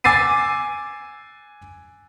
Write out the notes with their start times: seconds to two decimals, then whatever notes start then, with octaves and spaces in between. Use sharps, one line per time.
0.04 G#5 D6 E6 A6 C7 D#7